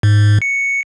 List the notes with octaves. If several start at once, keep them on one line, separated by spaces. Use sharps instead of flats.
G#2
C#7